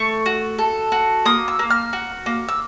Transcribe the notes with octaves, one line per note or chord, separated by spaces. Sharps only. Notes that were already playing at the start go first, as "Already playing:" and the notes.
Already playing: A3 C#6
F#4
A4
F#4
A#3 D#6
E6
A#3
F6
F#4
A#3
E6